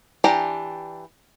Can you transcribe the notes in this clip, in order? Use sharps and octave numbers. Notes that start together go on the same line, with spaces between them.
E3 D4 G4 D5 A#5